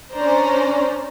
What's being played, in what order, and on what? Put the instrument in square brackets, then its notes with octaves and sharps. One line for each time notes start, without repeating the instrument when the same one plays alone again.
[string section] C#4 D4 C5 D5 A#5